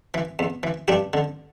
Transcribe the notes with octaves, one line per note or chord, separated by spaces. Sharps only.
E3
E2
E3
G2 D4 G4
D3